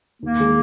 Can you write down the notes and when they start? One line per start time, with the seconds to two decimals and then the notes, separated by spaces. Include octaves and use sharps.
0.23 D#2 A#3
0.40 D#3 G#3 D#4